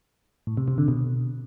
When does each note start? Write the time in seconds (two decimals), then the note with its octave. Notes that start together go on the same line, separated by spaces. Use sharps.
0.47 A2
0.57 C3
0.68 C3
0.78 D3
0.88 B2